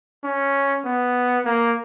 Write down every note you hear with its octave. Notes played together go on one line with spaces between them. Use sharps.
C#4
B3
A#3